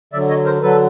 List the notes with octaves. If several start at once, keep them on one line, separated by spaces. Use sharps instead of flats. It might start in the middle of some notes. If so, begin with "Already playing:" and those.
D3 F#3 D5 E5
C#5 D#5
A#4 C5
D3 F#3 A4 B4